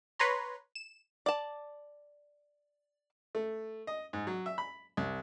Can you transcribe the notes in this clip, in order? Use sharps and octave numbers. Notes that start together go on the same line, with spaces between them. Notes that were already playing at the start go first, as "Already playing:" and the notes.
B4 C#5 A#5 C6
E7
D5 A5
A3
D#5
G#2
F#3
E5
B5
C2